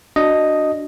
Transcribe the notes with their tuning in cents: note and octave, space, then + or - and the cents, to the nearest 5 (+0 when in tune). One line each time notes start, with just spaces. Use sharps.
D4 +0 F#4 -5 D#5 +0